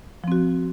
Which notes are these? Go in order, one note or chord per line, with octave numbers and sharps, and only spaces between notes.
F3 C4 F#4